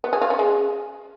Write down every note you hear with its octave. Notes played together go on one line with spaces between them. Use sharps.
B3
G#4
F4
C#4
G#3